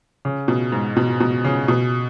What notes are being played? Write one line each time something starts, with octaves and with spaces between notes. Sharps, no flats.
C#3
B2
G#2
B2
B2
C#3
B2